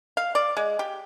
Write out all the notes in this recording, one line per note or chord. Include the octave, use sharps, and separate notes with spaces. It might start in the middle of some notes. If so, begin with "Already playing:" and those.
F5
D5
G#3
G4